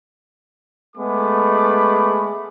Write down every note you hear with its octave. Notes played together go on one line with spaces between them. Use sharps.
G#3 A3 B3 G#4 B5 D6